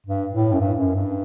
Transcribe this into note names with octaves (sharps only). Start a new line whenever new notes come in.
G2
A2
F#2
G2
F#2
G2